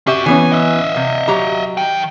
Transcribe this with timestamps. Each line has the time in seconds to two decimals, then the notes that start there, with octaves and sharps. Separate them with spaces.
0.07 C#4 F#4 G4 E5 G5
0.26 E3 B3 C#4 G#5
0.52 D#5 E5
0.96 C3
1.28 F#3 G4 A#5
1.77 D#3 G5